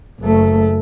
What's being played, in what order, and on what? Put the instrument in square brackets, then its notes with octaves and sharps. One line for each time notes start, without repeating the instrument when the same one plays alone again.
[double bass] F#1 A3